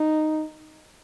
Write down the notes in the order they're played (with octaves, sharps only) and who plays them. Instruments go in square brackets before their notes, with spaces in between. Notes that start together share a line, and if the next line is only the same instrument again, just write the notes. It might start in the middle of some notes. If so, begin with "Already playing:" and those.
Already playing: [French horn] D#4